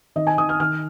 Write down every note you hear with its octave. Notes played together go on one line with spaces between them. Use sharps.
D#3 D#5
G#5
D#3 D#6
F6
D#3 F6